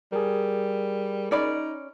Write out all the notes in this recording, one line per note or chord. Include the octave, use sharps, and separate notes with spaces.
G3 G#4 A#4
C#4 D#4 D5 B5